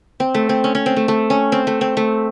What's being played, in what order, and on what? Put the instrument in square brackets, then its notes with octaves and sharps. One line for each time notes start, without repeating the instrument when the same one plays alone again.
[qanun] C4
A3
C4
C#4
C#4
C4
A3
A3
C#4
C4
A3
C4
A3